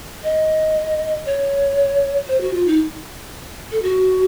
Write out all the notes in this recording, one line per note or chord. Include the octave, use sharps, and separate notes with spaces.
D#5
C#5
C5
F#4
F4
D#4
A4
F#4